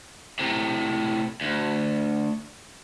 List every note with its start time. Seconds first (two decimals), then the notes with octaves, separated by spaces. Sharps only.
0.39 A2 C3
1.41 D2